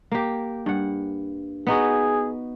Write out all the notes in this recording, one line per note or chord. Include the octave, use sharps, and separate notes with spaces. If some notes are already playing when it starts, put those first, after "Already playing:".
A#3 G4
G2 F#5
B3 D#4 F#4 G#4